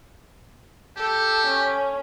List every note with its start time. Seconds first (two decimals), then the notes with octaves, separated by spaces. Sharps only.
0.97 G4 A4
1.47 C#4